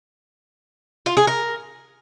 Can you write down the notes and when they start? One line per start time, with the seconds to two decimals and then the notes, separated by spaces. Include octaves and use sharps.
1.06 F4
1.17 G#4
1.27 A#4